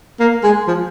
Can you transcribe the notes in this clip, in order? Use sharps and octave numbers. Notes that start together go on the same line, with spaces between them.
A#3
G#3
F3